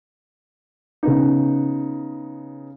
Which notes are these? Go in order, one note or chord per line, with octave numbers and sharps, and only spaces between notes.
C#3 B3 D#4